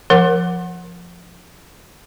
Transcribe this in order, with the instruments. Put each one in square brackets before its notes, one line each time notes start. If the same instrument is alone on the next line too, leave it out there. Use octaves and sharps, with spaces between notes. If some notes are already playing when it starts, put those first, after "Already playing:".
[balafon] F3 A#4 F#5 D6